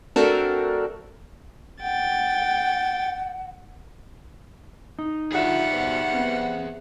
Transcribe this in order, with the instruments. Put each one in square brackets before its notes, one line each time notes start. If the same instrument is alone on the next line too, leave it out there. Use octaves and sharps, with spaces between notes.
[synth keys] A3 C4 D4 F#4 A4 A#4
[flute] F#5 [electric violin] G5 A6
[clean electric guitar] D#4
[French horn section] D3 F3 [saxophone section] G3 F#5 [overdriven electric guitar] G#4 E5
[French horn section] B2 C5
B3 C4